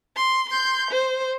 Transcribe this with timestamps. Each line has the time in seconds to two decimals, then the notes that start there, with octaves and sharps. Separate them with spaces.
0.16 C6
0.49 C6 G6
0.91 C5